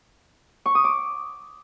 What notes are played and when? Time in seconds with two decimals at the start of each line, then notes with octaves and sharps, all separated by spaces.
0.66 C#6
0.75 D#6
0.84 D6